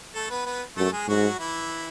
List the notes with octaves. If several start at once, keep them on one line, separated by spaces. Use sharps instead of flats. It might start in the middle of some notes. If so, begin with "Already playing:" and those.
A3 A4
B3 B4
B3 B4
F#2 A3 A4
G#3 G#4
G#2 F#3 F#4
E3 E4